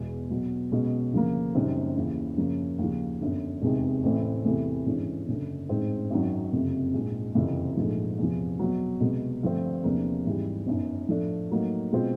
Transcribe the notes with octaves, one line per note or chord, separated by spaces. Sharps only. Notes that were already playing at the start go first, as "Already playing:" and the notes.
Already playing: E1 E2 B2 G#3
B1 B2 F#3
B1 B2 G#3 C#4
D2 C#3 F3 A#3
F#1 F#2 D#3 G3 C4
D#2 C#3 E3
F#2 C#3 F3 A#3 C#4
D#2 C#3 F3
G1 F#2 D3
F1 E2 C3 D#3 G#3
A1 A2 E3 A3 C4
E2 C3 E3 A3
G#1 G2 E3 G#3 C#4
F#1 F#2 D3
A1 G#2 D#3 G#3 C4
G#1 F#2 D#3 F#3
F#1 F2 C3
A#1 G#2 D#3
F#1 F2 C3 E3
A#1 G#2 F3 A3
E2 C3 F3
B1 B2 F#3
C2 B2 G#3
G2 D3 F3 A3 C4
E2 C3 F3 A#3 D4
G#1 G#2 E3 G3
G1 F#2 D#3
A2 F3 A3 D4
A2 F#3 A#3 D#4
B2 G#3 C4 F4